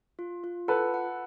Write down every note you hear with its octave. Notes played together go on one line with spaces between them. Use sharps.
F4
F4
A4 B4 F#5
F#5